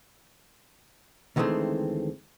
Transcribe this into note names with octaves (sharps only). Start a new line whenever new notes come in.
D2 D#3 E3 G#3 A3 C4